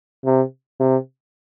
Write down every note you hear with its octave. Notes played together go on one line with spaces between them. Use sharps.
C3
C3